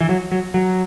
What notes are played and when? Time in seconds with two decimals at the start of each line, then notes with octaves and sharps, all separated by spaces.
0.01 E3
0.09 F#3
0.32 F#3
0.54 F#3